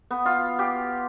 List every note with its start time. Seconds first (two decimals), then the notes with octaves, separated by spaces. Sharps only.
0.11 B3
0.25 F4
0.59 G4